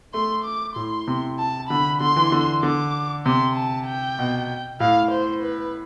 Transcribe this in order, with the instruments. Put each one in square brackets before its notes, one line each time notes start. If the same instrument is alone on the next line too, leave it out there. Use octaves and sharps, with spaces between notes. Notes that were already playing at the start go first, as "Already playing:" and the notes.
[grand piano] A3 [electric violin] C6
[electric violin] D6
[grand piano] A2 [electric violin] C6
[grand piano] C3
[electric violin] A5
[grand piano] D3 [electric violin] B5
[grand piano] D3 [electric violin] C6
[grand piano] E3
D3
[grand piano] D3 [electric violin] D6
[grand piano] C3 [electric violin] C6
[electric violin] A5
G5
[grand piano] B2
[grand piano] A2 [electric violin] F5
[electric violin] C5
B4